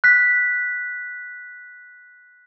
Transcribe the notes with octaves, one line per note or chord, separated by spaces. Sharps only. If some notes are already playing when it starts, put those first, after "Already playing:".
F#6 B6